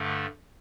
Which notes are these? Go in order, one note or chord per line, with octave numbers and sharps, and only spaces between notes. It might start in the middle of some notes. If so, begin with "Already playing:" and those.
Already playing: G2 D3 A3